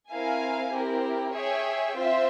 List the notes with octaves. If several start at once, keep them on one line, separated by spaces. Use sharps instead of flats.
C4 E4 A#4 F5 G#5
C4 E4 G4 A#4
G#4 C#5 E5 G5
C4 F4 C5 E5